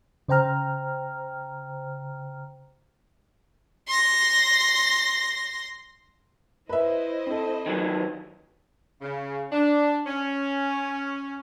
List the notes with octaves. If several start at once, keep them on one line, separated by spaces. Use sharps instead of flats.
C#3 C5 G5 A#5 F6
C6 A#6
E4 B4 C5 D#5 E5
C4 A4
D#3 E3 F#3
C#3
D4
C#4